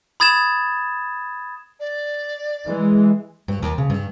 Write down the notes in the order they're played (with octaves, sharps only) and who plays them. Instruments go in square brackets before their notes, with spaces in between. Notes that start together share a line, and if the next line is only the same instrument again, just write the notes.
[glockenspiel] B5 D#6 G#6 A6 E7
[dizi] D5
[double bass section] E3 G#3
[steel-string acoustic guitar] G2
D#2
C#3
G2